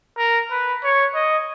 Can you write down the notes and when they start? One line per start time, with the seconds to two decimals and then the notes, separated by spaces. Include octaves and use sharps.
0.18 A#4
0.51 B4
0.84 C#5
1.15 D#5